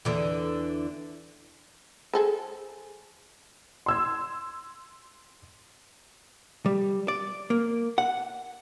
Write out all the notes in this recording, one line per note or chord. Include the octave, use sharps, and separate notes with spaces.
E2 D3 E3
G#4 A4 C5
C6 E6 G#6
G3
D5
A#3
F#5